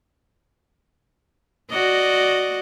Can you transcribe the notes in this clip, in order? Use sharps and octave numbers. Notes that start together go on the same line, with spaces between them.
F#4 D5 D#5